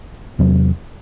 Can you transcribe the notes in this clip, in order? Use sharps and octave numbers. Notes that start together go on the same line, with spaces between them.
E2 C3 F#3 C4